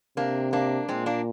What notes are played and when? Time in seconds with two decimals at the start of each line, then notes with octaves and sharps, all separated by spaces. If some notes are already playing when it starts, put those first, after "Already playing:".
0.17 C3 A#3 D4
0.53 A#3 D4
0.88 A#2 G#3 C4
1.06 A#3 D4